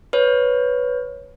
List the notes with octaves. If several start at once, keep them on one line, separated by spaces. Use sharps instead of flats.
B4 C#5